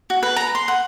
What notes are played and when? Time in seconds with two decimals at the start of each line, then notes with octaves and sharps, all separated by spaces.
0.10 F#4
0.23 B4
0.37 A#5
0.55 C6
0.68 F#5